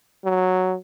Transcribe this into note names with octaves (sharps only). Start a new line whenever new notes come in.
F#3